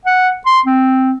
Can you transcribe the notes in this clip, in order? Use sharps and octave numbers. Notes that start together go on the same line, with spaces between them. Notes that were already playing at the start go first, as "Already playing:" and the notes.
F#5
C6
C4